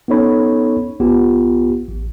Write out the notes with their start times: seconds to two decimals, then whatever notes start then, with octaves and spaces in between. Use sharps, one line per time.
0.08 B3 C#4 D#4 A4 C#5 B5
1.00 A#1 B3 F4 G4
1.88 A1